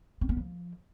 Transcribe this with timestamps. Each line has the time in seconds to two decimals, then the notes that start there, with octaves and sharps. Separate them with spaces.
0.21 C4
0.29 B3
0.37 F3